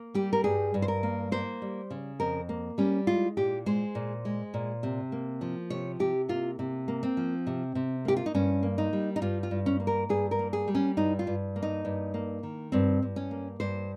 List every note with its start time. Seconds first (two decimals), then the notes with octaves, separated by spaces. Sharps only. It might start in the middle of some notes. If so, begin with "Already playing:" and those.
Already playing: A#3
0.14 G3 G4
0.33 A#4
0.44 G2 G#4
0.74 G2
0.82 C5
0.88 A#4
1.03 A#3
1.32 A#3 C5
1.62 G3
1.90 C#3
2.20 F2 A#4
2.49 A#3
2.78 G3 C#4
3.07 G#3 F4
3.37 A#2 G4
3.66 G#3 C5
3.95 A#2
4.25 G#3
4.54 A#2
4.83 C3
5.12 A#3
5.41 F3
5.70 C3 C#5
6.00 C3 G4
6.29 A#3 F4
6.59 C3
6.88 A#3
7.03 C4
7.17 F3
7.47 C3
7.75 C3
8.05 A#3 G4
8.17 F4
8.26 D#4
8.35 G2 C#4
8.63 A#3
8.78 D#4
8.93 G3
9.16 D#4
9.21 G2 F4
9.43 F4
9.51 G2
9.66 C#4
9.80 A#3
9.87 A#4
10.09 G2 G#4
10.31 A#4
10.39 A#3
10.53 G#4
10.68 G3
10.75 C#4
10.97 G2 D#4
11.19 F4
11.27 G2
11.56 A#3
11.62 D#4
11.85 G2
12.14 A#3
12.43 D#3
12.72 G2 C4
13.02 G2
13.16 C#4
13.31 A#3
13.60 G2 C5